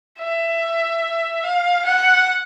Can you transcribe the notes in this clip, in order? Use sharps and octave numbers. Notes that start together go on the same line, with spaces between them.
E5
F5
F#5